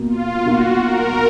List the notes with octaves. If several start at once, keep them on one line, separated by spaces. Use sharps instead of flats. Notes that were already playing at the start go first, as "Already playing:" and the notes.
Already playing: B2 A#3
F4
B2 A#3 D#4 F#4
A#4